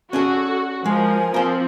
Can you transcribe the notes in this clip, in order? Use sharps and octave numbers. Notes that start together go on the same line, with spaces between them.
C#4 D4 F#4 G#4 A4
F3 G#3 A#4 G#5
F3 C4 A#4 C5